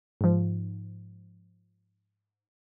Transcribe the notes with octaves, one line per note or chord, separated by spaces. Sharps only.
G#2 F3